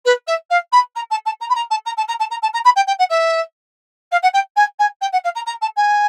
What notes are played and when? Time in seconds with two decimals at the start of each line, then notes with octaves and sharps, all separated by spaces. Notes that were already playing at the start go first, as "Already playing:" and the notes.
0.05 B4
0.27 E5
0.50 F5
0.72 B5
0.95 A#5
1.10 A5
1.25 A5
1.40 A#5
1.49 B5
1.55 A#5
1.70 A5
1.85 A#5
1.97 A5
2.08 A#5
2.19 A5
2.30 A#5
2.42 A5
2.53 A#5
2.64 B5
2.76 G5
2.87 G5
2.99 F#5
3.09 E5
4.11 F5
4.22 F#5
4.33 G5
4.56 G#5
4.79 G#5
5.01 G5
5.12 F#5
5.24 F5
5.35 A#5
5.46 A#5
5.61 A5
5.76 G#5